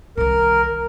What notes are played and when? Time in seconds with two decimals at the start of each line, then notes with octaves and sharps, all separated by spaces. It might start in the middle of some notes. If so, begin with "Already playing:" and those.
0.17 C2 D#3 A#4